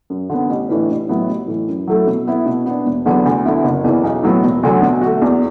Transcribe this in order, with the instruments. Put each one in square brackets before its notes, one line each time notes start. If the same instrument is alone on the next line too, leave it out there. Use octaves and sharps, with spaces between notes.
[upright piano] F#2
D3 B3
A1
A2 E3 D4 B4
A1
A2 F#3 B3 E4
A1
A2 E3
F#2
F#3 A3 E4 A4
B2
B3 E4
B2
B3 D4
E1
E2 D3 F#3 B3
D2
D3 B3 E4
F#1
E2 E3
B1
A2 F#3 B3
E1
D2 D3 F#3
B2
A3 F#4
E2